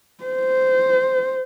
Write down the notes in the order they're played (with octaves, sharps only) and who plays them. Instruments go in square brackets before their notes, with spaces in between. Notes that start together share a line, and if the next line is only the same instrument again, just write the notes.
[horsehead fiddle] C5